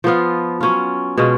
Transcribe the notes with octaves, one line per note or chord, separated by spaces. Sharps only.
F3 B3 F4
F#3 C#4 F4
B2 G#3 C#4 F4